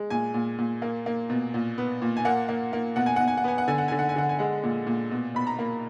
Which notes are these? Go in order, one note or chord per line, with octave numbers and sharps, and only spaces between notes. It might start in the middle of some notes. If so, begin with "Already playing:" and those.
Already playing: G#3
A#2 G#5
A#2
A#2
A#3
A#3
B2
A#2
B3
A#2
G#5
A#3 F#5
A#3
A#3
B2 F#5
G#5
B2 F#5
G#5
F#5
B3 G#5
F#5
D3 G#5
F#5
D3 G#5
F#5
G#5
D3 F#5
G#5
G#3 F#5
A#2
A#2
B2
B2 B5
A#5
A#3